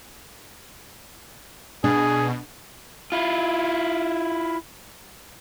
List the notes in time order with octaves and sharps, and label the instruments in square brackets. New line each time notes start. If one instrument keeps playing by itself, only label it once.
[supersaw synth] B2 [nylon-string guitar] D4 [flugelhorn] G#4
[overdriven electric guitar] E4 F4